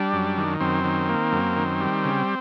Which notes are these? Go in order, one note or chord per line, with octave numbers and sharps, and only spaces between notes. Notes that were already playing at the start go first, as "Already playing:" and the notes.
Already playing: G3 D4
F#2
D#3
F#2 C4
D#3
A#3
F#2
D#3
G3
C#3